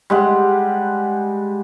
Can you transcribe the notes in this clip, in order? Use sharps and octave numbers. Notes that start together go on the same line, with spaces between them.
G3 G#3 F#5